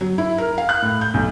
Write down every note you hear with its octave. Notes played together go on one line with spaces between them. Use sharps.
F#3
E4
A#4
F5
F#6
A2
G6
B1